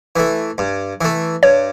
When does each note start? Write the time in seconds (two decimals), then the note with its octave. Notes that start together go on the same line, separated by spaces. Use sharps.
0.16 E3 A3
0.58 G2
1.01 E3 A3
1.43 G2 C#5